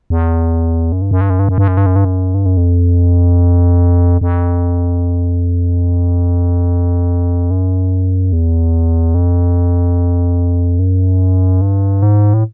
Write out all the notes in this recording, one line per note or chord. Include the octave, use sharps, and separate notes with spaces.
E2
F#2
G2
F#2
G2
F#2
G2
F#2
G2
F#2
G2
F#2
G2
F#2
G2
F#2
F2
F2
F#2
E2
F2
F#2
G2
G#2
A2